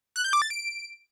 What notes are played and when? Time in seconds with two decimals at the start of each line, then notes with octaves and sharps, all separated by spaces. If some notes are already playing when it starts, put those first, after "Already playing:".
0.16 F#6
0.24 G6
0.33 D6
0.42 A6
0.50 D7